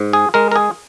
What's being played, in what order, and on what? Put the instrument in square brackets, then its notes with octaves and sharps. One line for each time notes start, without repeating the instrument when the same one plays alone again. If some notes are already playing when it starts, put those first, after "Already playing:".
Already playing: [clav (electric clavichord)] G#2
G#4
G#3 A#4
A#4
G#4